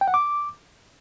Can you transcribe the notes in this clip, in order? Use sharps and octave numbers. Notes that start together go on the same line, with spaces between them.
G5
F#5
D6